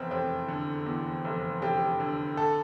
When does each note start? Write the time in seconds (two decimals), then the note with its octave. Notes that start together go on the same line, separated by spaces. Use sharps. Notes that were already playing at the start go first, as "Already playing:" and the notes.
Already playing: F1 E2 B3 C4
0.11 F1 C4
0.48 D3
0.86 E2
1.24 F1
1.62 F1 G4
2.00 D3
2.37 A4